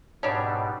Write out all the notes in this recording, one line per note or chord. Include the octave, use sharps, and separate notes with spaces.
G#2 B2 G3 C#4 D4